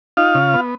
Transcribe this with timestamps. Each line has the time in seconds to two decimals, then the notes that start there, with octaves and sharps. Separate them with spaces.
0.17 D#4 F4 F5
0.35 C#3
0.54 B3